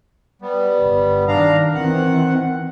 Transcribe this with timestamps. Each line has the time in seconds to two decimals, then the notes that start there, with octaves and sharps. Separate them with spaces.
0.42 G3 B3
0.81 G1
1.28 D#3 D4 F5 A#5
1.75 D#3 E3 C4 F#5